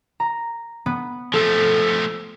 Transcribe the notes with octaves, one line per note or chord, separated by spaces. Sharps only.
A#5
B3
F3 A3 A4